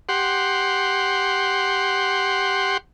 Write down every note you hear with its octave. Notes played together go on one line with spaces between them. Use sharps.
G4 F#5 C6